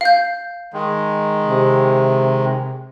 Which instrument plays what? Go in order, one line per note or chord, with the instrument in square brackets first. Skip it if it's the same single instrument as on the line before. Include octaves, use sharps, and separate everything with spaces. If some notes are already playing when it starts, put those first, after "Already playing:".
[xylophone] F5 G6
[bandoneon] D#3 G#3
[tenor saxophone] C3